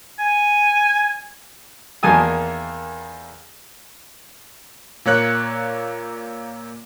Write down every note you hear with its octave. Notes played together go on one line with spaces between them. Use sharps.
G#5
E2 D#3 A#3 G#5 A5 D#6
A#2 A#3 C#5 F#6 C#7